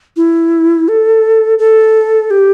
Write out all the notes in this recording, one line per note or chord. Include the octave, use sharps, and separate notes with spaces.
E4
A4
A4
G4